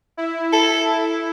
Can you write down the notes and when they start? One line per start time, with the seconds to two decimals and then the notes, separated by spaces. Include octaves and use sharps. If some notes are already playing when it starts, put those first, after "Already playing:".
0.17 E4
0.52 E4 A4
0.86 E4